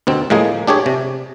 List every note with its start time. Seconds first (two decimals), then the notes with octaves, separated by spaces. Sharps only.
0.07 D2 B2 C4
0.30 A2 F3 G#3 A#3 G#4
0.67 D4 G4 G#4 C#5
0.86 C3